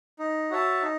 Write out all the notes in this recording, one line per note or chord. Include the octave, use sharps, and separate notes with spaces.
D#4
F#4 C#5 E5 A5
D#4